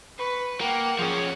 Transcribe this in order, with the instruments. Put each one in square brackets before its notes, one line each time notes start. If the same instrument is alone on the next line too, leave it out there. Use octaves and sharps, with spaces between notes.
[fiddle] B4 C#6
[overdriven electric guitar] A#3 [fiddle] F#5 [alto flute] G5
[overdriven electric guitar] F3 C#4 [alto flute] G#4